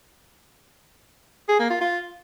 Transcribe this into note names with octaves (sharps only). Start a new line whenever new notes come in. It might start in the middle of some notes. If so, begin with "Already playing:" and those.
G#4
A#3
F4
F4